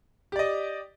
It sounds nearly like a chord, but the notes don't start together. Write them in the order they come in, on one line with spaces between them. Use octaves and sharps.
G4 D5 D#5